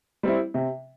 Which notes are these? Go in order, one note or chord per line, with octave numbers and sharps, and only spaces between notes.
G3 C4 E4
C3